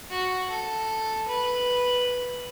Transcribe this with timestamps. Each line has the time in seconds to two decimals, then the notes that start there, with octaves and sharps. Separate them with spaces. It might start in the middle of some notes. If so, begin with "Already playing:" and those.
0.10 F#4
0.50 A4
1.28 B4